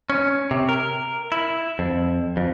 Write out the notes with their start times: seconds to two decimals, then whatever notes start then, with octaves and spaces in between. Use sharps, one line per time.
0.10 C#4
0.51 C3
0.69 A#4
1.32 E4
1.79 F2
2.37 F2